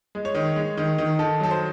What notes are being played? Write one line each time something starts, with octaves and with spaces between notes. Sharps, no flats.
G#3
C#5
D#3
G#3
D#3
D#3
D#3 A4
F#3 A4
C5